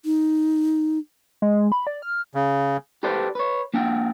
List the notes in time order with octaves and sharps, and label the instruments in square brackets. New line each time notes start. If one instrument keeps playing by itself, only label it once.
[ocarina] D#4
[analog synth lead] G#3
B5
D5
F6
[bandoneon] C#3
[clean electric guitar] G4 A4 B4 C5 D5
B4 C#5
A#3 D4 F#5 G5